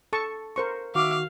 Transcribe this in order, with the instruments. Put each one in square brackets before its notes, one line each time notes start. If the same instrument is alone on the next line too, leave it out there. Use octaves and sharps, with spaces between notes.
[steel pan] A4 A5 C#6
A#4 C5 C#6
[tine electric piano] D#3 F#4 [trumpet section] E5 D6 [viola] F5